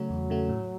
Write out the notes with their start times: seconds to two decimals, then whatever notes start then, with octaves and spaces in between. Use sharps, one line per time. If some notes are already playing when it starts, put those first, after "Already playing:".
Already playing: C#3 F#3 A3 F#4
0.10 E2
0.30 C#3 A3 F#4
0.49 A2